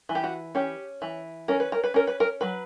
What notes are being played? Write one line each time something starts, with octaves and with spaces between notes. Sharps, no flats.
E3
G4
F#4
C#4 G4
E3
C#4 A#4
B4
A#4
B4
C#4 A#4
B4
A#4
F#3 B4